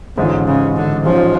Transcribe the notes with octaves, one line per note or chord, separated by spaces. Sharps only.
A1 G#2 D3 G#3 C#4 F4
C#3
D3
A1 G#2 F3 G#3 C#4 F4